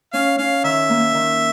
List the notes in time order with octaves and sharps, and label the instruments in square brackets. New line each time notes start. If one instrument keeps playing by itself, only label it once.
[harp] C#4 [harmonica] F5
[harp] C#4 [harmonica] F5
[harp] D#3 [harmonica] E5
[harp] A#3
D#3